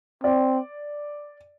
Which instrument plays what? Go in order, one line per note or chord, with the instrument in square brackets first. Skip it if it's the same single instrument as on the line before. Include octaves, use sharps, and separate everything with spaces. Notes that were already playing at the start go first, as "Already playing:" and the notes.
[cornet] C4 [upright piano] D5